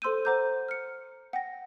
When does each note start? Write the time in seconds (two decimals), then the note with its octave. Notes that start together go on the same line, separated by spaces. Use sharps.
0.02 A4 C5 C6 E6 G6 D#7
0.25 C5 F#5 A#5 D6 G6
0.69 F6 C#7
1.33 F#5 G5 A#6